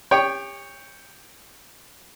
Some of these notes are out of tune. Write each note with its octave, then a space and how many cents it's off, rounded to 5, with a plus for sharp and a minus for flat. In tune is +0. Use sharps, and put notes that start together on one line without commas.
G4 +35 C#5 +0 G5 +0